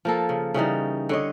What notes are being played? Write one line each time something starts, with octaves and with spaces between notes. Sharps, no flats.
F3 A#3 A4
C#3
C#3 E3 G3 D#4
D3 C#5 D#5